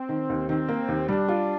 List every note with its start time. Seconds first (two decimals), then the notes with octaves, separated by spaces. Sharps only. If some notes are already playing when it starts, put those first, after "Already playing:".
Already playing: C4
0.09 D#3
0.29 D#2
0.48 D#3 C4
0.68 A#3
0.88 D#2
1.08 G3 D4
1.28 F4